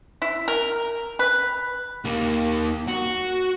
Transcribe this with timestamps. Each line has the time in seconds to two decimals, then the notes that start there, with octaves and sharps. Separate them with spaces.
0.22 E4
0.48 A#4
1.19 B4
2.05 D#2 A#3
2.88 F#4